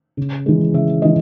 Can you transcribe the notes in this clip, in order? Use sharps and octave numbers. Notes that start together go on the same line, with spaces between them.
C#3
E3 G#3
C#3 E5
E3 G#3 D#5